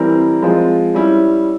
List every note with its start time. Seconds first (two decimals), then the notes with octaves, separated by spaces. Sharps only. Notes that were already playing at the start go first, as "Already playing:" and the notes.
Already playing: E3 G3 C4 E4 A#4
0.42 F3 G#3 C4 F4
0.95 G3 C#4 E4